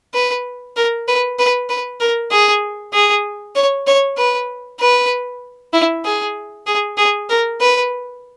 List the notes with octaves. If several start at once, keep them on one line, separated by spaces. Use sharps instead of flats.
B4
A#4
B4
B4
B4
A#4
G#4
G#4
C#5
C#5
B4
B4
E4
G#4
G#4
G#4
A#4
B4